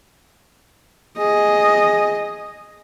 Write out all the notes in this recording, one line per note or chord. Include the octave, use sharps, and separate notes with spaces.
G#4 D#5